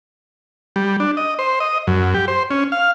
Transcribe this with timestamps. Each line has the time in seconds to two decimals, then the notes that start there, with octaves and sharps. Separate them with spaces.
0.76 G3
1.00 D4
1.17 D#5
1.39 C5
1.60 D#5
1.87 F#2
2.14 G4
2.28 C5
2.51 C#4
2.72 F5